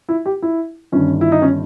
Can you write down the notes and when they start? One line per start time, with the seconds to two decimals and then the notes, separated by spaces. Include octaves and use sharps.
0.09 E4
0.26 G4
0.42 E4
0.92 G1 G2 D#3 C#4
1.21 E4
1.32 D#4
1.42 C#4